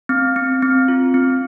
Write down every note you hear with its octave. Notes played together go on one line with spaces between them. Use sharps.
C4
C4
C4
F4
C4